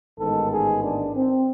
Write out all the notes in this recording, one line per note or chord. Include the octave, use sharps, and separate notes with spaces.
A1 G#2 D#3 G#3 B3 A4
G#4
D4
C4